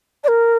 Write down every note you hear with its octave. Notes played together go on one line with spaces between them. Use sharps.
D5
A#4